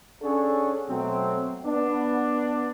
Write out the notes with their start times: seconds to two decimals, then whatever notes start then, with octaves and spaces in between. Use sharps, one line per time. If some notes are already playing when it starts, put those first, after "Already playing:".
0.22 C#4 D4 G#4 A4 C#5 F#5
0.88 B2 F#3 A3 C4
1.65 B3 D4